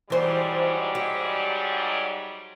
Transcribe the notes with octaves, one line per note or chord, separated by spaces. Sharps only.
G#2 E3 F#3 G3 C5
G4